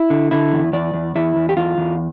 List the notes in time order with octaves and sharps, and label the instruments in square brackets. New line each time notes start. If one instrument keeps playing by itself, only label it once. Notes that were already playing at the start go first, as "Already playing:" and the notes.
Already playing: [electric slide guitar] E4
D3
D3 E4
E2
E2 D5
E2
E2 E4
E2
G4
E2 F4
E2